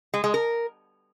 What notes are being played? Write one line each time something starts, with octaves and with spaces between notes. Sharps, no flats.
G#3
G#3
A#4